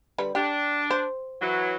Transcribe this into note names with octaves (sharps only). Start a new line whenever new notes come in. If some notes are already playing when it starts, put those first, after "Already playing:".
D3 G3 B4
D4 G4
C5
E3 F#3